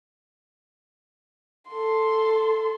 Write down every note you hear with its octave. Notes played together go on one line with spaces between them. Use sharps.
A4 C6